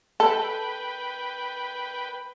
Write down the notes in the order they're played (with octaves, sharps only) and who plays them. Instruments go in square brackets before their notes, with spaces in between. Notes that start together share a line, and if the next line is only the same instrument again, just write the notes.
[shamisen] A4 [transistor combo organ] B4 G5